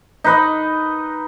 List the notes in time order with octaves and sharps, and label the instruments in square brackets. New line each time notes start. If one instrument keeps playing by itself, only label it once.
[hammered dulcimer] D#4 B4 D#5